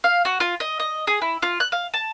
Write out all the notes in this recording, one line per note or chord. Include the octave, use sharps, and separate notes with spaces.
F5
F#4
F4
D#5
D#5
G#4
E4
F4
F#6
F5
A5